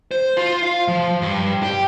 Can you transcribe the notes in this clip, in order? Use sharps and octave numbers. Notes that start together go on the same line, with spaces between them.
C5
F4
F5
F3
G2
G4